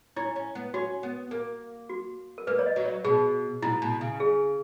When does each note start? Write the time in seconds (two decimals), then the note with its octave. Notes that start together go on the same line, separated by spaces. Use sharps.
0.16 C#4 E4
0.36 C#4
0.55 B3
0.74 C#4 F#4
1.03 B3
1.31 A#3
1.89 F#4
2.38 A#4
2.47 A#3 B4
2.59 C#5
2.66 D#5
2.76 F#3
2.85 C#5
3.05 B2 G#4
3.62 B2 E4
3.82 B2
4.01 C#3
4.20 G#4